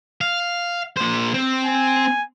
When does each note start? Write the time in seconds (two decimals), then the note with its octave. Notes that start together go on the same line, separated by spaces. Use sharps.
0.21 F5
0.97 A#2 C5
1.34 C4
1.65 G#5